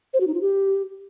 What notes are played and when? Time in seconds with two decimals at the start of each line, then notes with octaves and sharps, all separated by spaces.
0.14 C5
0.20 F#4
0.27 D#4
0.34 F4
0.41 G4